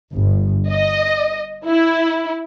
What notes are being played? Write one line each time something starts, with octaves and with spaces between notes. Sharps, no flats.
G1
D#5
E4